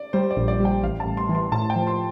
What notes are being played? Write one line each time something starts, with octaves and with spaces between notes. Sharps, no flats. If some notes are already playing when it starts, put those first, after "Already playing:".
Already playing: D5
G3 C5
D5
A#1
D5
G3 G5
A1 F5
A5
A1
C6
E3
C6
A2 A5
G5
F3
C6